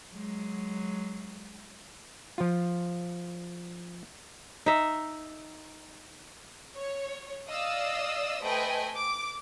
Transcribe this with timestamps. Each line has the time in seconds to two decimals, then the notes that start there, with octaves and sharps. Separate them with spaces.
0.12 F#3 G#3
2.38 F3 F4
4.66 D#4 E5
6.77 C#5
7.49 D5 D#5 F5 D#6 E6
8.42 A3 B4 C5 D#5 G5 G#5
8.95 D6